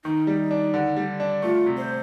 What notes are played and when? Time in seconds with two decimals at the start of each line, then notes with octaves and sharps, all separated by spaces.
0.04 D#3 D#4
0.27 G3
0.51 D4
0.74 D3
0.96 G3
1.20 D4
1.42 A3 F4
1.66 C3
1.77 C5